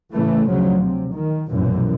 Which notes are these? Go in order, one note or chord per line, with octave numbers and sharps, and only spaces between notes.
A2 C#3 E3 A3
D2 C#3 F3 F#3
C3
D#3
F1 B1 F#2 A#2 E3